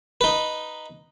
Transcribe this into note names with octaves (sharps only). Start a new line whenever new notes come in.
D#4 B4